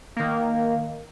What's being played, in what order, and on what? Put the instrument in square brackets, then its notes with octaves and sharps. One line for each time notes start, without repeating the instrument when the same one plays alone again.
[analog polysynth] D#3 A#3